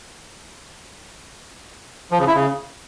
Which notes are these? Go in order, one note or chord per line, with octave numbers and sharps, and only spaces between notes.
F3
C#3
E4
C#3